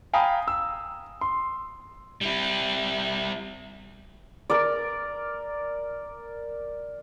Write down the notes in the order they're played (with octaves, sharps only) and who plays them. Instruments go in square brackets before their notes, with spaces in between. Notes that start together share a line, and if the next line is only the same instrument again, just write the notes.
[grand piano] F5 G5 G#5 A#5 B5 D#6
E6
C6
[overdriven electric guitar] G3 E4
[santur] A#4 D5